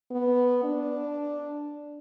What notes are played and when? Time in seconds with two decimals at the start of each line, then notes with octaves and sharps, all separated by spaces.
0.11 B3
0.64 D4